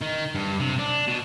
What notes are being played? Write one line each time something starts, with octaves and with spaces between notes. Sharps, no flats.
D#3
G2
C3
D4
B2